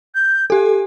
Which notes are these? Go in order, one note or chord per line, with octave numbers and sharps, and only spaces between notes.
G6
G4 A4 G#5